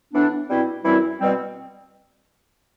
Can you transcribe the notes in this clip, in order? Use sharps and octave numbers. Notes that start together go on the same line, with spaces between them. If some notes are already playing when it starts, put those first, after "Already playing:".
A2 E3 B3 D4
B2 G3 C4 E4
F#2 E3 G3 C4 E4
B2 G3 C4